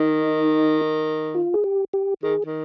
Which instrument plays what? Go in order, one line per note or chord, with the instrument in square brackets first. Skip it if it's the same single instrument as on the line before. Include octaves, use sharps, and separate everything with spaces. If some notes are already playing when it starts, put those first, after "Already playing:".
Already playing: [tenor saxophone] D#3 [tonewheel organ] D#4
[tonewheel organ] F4
G#4
G4
G4
[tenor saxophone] D#3 [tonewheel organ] G#4
[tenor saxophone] D#3